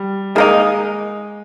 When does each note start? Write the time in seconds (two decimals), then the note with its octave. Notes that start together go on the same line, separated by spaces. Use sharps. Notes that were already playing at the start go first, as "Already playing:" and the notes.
Already playing: G3
0.35 D#3 G#3 A#3 D#4